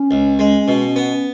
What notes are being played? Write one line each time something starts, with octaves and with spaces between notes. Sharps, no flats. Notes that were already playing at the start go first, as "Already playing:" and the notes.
Already playing: C#4
C#2
G#3
B2
B3